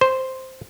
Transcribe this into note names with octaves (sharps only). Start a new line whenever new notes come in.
C5